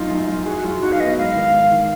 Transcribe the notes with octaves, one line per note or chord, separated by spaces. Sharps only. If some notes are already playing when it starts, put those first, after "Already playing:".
Already playing: F#2 D#4 F4
F#2
F#2
F4
F#4 G#4
F#4
F#3 F4
D#4 F#4
F5
B3 D#5
G#2 F5
D#3
G#2
D#3